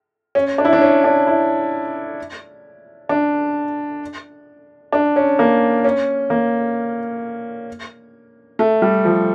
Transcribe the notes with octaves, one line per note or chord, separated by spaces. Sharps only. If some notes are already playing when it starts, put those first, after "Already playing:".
C#4
D4
E4
D4
C#4
D4
E4
D4
D4
C#4
A#3
C#4
A#3
A3
G3
F3